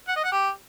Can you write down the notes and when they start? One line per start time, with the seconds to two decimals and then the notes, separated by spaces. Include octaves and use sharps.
0.08 F#5
0.16 D#5
0.24 F#5
0.32 G4